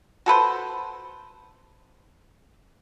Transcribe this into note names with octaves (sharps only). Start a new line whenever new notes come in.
F#4 A4 B4 C5